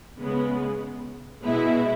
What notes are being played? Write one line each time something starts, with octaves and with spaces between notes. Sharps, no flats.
C#3 G#3 B3
B2 G#3 B3 E4